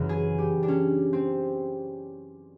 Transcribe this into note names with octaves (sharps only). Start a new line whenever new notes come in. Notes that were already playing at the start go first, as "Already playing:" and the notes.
Already playing: F#2 C#3 E3
G#4
G4
D4
C#4
C4